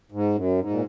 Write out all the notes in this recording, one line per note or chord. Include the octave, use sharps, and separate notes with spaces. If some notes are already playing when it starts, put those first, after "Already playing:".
G#2
F#2
G#2
A#2